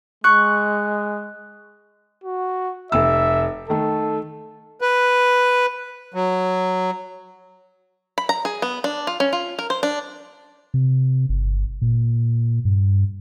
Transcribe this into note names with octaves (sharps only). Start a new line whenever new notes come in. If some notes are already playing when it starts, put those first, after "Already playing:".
G#3 C#6 F#6
F#4
F1 E5 E6
D#3 A3 A4
B4
F#3
B5
A#5
G#4
B3
D4
F4
C#4
F4
A#4
C5
D4
C3
G1
A#2
G2